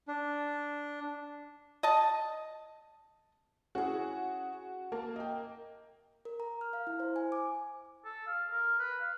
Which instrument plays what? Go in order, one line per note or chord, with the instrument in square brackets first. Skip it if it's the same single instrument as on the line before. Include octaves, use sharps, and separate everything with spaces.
[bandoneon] D4
[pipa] D#5 A5
[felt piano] C#4 E4 G#4 [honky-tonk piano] F#4
[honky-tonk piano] A#3 [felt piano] A5
[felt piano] D#5 G5
[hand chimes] A#4
A#5
F6
F5
E4
C5
G#5
D6
[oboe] A4
F5
A#4
B4
F5